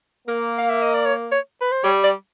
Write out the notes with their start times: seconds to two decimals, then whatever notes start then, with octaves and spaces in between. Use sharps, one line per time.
0.27 A#3
0.58 F5
0.70 E5
0.82 D#5
0.94 D5
1.06 C#5
1.32 C#5
1.61 B4
1.72 C5
1.84 G3 C#5
2.04 D5